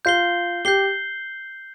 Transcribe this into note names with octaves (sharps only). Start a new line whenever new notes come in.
F4 G6 C7 G7
G4 G6 C7 G7